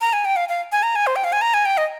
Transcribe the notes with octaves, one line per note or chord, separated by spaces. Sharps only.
A#5
G#5
G5
F5
F5
G#5
A#5
G#5
C5
G5
F5
G#5
A#5
G#5
G5
D#5